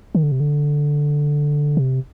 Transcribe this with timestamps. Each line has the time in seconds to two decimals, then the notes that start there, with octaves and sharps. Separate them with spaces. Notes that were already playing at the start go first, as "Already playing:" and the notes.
0.15 D#3
0.23 D3
0.32 C3
0.40 D3
1.77 C3